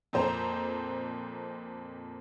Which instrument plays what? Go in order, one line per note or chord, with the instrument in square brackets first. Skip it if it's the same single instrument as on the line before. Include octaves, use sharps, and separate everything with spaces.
[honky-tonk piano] F2 A#2 C5 A#5